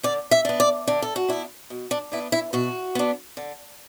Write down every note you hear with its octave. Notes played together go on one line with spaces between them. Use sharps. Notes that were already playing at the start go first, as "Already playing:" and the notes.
D3 D5
E5
B3 D4
D5
D3 D4
A4
F#4
B3 D4 E4
B2
D4
B3 D4 E4
E4
B2 F#4
B3 D4
D3